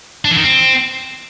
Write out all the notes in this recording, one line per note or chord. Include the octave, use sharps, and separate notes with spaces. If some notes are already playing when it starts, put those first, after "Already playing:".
D4
E3
D#3
C4